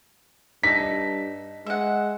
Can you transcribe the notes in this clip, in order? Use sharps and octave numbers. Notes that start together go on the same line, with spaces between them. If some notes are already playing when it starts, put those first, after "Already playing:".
G2 D#4 A4 B6
G#3 E5 F#5